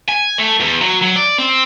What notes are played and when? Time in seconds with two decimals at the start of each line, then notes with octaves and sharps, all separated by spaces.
0.09 G#5
0.38 A3
0.60 E2
0.81 F#3
1.02 F#3
1.16 D5
1.38 C4